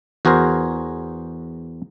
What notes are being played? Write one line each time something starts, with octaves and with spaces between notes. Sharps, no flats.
E2 F#4 G#4 A#4 C5